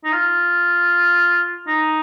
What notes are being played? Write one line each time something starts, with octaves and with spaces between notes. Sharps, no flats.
D#4
F4
D#4